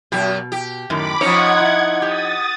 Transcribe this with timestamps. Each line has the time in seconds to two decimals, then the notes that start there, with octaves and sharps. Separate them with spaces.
0.12 F#2 B2 G4
0.52 G4
0.90 F#2 A2 D#3 B5 D6
1.21 F3 C#4 D#4 C#5 F#5 G#6
1.60 E4
2.02 G4 D#6 A6